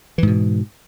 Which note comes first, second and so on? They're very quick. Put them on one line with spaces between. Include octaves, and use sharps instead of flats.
E3 G#2 B2